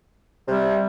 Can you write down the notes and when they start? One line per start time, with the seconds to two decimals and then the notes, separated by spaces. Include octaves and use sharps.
0.48 C3 G3